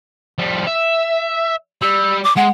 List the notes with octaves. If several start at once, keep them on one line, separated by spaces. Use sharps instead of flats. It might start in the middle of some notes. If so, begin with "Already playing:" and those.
F3 G3
E5
G3 E6
D6
G#3 F#5